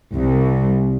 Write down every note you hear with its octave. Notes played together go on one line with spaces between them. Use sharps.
C2